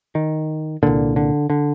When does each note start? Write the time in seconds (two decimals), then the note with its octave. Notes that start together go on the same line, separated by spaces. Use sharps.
0.15 D#3
0.83 C2 A#2 D3
1.16 D3
1.50 D3